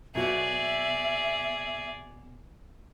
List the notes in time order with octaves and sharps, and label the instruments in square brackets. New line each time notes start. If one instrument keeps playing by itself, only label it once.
[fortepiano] B1 F#4 [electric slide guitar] B2 [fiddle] G#4 D5 [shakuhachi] E5